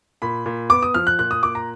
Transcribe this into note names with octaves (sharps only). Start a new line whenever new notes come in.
A#2 B5
A#2
B3 D6
D#6
F3 F6
F#6
A#2 F#6
D#6
A#2 D6
A#5